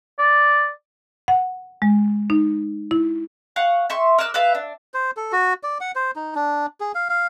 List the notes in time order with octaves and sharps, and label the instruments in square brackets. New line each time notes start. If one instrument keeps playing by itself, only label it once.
[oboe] D5
[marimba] F#5
G#3
D#4
E4
[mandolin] F5 F#5 C#6
E5 C6 C#6
A#4 D6 E6 F#6
B4 E5 F5
D4
[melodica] C5
A4
F#4
D5
F#5
C5
D#4
D4
G#4
F5
F5